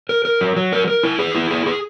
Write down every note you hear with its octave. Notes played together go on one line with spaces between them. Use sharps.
A#4
A#4
F#3
F#3
A#4
A#4
E4
G#4
E4
G#4
G#4